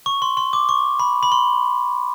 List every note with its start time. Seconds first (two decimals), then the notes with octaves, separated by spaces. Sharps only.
0.06 C#6
0.22 C6
0.37 C6
0.53 D6
0.69 C#6
1.00 B5
1.23 B5
1.32 C6